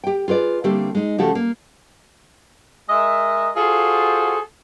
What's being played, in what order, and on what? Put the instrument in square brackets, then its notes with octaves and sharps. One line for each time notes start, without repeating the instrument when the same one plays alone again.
[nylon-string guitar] G4 G5
F4 G#4 B4 D5
D3 G3 A3 A#3 C4 G4
G#3 D#4
C#3 F3 A3 F#4 G4 A4
A#3
[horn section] G#3 A#4 D#5 E5
F4 F#4 G#4 A4 C5